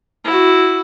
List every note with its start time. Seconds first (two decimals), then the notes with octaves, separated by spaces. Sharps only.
0.24 E4 F#4